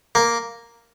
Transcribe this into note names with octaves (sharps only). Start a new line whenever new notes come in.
A#3